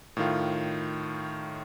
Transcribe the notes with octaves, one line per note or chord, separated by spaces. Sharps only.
A2 D#3 F4